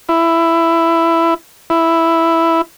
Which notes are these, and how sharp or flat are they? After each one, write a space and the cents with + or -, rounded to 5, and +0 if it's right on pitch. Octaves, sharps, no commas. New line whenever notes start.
E4 +10
E4 +0